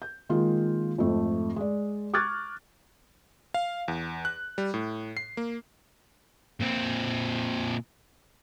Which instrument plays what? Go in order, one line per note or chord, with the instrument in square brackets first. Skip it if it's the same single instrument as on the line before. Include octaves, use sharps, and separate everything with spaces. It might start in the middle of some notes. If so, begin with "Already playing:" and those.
[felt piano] G6
D#3 G#3 A#3 F4
F2 G#2 A3
G#3 D5
C#6 D6 F6 F#6 G#6 A6
[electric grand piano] F5
E2
F#6
G3
A2
C7
A#3
[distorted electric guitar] A#2 C4